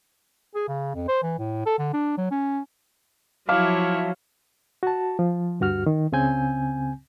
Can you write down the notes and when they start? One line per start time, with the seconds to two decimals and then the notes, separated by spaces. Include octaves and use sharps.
0.55 G#4
0.68 C#3
0.94 F2
1.08 C5
1.23 E3
1.38 A2
1.66 A4
1.79 D3
1.93 D4
2.17 F#3
2.31 C#4
3.49 F3 F#3 E4 C#5 E5 F5 A5 D6
4.83 F#4 A5
5.19 F3
5.60 D2 G2 F#4 F6
5.86 D#3
6.12 C#2 C#3 C4 G#5 G6